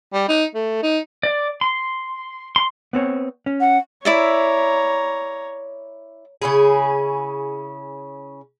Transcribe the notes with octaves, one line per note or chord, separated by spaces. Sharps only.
G3
D#4
A3
D#4
D5
C6
C6
B3 C4 C#5
C#4
F#5
E4 C#5 D5 E5 A#5
C#3 C#4 E4 G#4